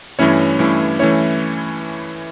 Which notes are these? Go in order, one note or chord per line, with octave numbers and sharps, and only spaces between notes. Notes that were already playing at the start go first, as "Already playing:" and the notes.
G2 E3 A3 C#4 E4 C#5
G2 E3 A3 C#4 E4
E3 A3 C#4 E4 C#5